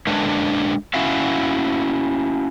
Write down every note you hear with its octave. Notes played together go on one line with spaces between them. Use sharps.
D3 G#3 A#3 C#4 D4 B4
C#4 E4 F#4 E5 F5